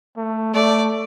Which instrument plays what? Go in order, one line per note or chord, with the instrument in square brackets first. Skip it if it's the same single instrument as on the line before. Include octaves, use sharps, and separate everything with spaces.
[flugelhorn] A3
[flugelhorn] A3 [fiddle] D5